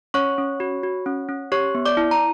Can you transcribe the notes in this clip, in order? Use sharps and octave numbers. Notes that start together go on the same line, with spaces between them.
C#4 C#5 C#6
C#4
F#4
F#4
C#4
C#4
G4 C#5 C#6
B3
D5 D6
E4
A#5